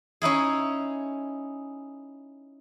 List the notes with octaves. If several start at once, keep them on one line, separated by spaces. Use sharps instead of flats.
C#4 D#4 E4 G#4